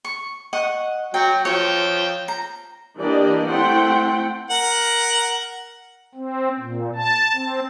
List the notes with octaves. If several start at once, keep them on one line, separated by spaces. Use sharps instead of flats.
C#6
D#5 F#5 C#6
F#3 G5
F3 C#5 G5
A#5
E3 A#3 D4 G4 D5 D#5
A3 C4 E4 F#5 G5 C6
A#4 F#5
C4
A#2
A5
C4